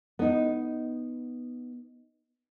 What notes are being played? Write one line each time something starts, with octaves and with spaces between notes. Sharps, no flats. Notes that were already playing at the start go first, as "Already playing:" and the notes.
B3 D#4